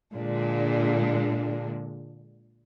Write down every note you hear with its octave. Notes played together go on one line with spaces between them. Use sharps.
A#2 D3 G#3 D4